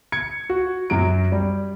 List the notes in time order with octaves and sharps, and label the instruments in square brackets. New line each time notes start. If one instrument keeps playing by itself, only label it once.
[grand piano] G#6 C#7
F#4
F#2 F#3 D7
G3